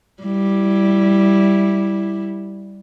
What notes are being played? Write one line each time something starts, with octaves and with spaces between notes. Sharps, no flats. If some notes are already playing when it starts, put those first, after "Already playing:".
G3 E4